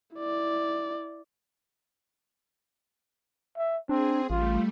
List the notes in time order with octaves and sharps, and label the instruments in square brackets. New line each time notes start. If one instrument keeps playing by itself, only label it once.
[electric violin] E4 D5
[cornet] E5
[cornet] C4 [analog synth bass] D4 [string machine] G#4
[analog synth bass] A1 [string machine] G3 A3 [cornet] F4